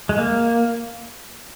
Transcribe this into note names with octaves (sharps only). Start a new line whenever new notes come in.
G#3
A#3